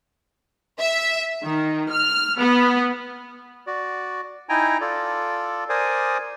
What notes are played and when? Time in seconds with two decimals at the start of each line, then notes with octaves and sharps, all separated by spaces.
0.79 E5
1.43 D#3
1.91 F6
2.40 B3
3.67 F#4 D5
4.49 D#4 E4 G5 G#5 A#5
4.81 F4 A4 D5
5.69 A#4 C5 D5 G#5 D#6